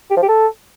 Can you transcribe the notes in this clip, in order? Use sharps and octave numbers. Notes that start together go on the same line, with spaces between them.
G4
F3
G4
A4